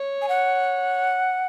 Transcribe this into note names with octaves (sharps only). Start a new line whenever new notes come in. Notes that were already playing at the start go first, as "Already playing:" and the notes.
Already playing: C#5
G#5
F#5